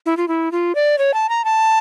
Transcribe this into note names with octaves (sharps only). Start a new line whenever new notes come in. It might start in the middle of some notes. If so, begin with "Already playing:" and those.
E4
F4
E4
F4
D5
C#5
A5
A#5
A5